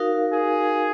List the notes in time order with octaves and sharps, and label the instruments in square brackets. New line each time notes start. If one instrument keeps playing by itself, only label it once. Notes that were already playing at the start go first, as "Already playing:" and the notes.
Already playing: [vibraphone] D#4 F#4 A#4 F5
[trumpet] G#4